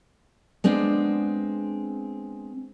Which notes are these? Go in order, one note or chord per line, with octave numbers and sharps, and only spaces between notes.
G#3 B3 C4 D4